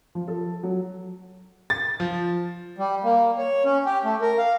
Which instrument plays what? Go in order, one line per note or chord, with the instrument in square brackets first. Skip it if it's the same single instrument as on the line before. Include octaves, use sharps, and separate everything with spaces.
[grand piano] F3
A4
F#3
A6
F3
[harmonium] G3
A#3
C#5
C#4
G4
A3
A#4
F5